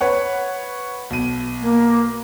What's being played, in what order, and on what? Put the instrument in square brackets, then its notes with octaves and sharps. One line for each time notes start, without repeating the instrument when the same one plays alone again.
[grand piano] B4 C#5 F#5
B1 D#7
[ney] A#3